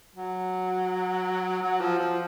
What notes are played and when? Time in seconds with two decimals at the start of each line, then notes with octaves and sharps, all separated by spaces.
0.16 F#3
1.62 F#3
1.80 F3
1.99 F3